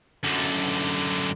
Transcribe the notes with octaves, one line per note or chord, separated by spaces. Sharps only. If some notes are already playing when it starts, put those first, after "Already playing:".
F#2 D3